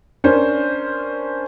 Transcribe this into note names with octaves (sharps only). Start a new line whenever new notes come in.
C#4 D4 A#4 C5